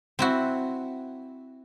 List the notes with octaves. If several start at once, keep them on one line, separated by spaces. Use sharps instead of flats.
C4 E4 F#4